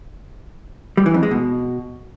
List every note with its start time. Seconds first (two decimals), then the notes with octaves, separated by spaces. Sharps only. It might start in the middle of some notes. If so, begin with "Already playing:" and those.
0.97 G3
1.06 E3
1.14 F2
1.23 G#3
1.31 B2